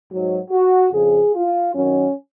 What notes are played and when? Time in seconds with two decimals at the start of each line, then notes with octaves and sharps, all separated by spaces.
0.10 G#2 F#3
0.51 F#4
0.93 F2 C#3 F3 G#4
1.35 F4
1.75 F#2 D#3 F#3 C#4